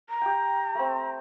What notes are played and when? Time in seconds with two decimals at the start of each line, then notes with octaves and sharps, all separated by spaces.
0.09 A#5
0.22 G4 G5
0.75 A3 C4